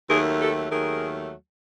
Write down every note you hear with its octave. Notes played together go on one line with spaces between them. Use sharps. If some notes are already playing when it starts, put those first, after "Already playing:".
D#2 D#3 F#3 A3 G#4 A#4
G4 A4
D#2 D#3 F#3 A3 G#4 A#4